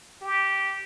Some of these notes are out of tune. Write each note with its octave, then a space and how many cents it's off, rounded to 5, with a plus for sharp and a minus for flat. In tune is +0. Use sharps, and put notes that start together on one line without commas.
G4 -10